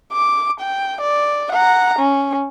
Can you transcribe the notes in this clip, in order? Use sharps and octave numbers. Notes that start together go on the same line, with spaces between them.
D6
G5
D5
F#5 A#5
C#4